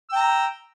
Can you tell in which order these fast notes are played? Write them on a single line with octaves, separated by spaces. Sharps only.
E6 G5 A#5